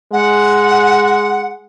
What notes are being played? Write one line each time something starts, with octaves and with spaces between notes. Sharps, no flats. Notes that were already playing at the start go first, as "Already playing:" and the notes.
G#3 F#5